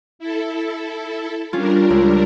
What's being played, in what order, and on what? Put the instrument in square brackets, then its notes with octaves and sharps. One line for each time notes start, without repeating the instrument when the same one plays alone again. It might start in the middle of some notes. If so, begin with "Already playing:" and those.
[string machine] E4 A4
[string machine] G3 D4 A#4 [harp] C#4 F4
[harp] C#2